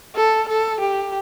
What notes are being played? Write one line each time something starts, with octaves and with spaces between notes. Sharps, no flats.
A4
A4
G4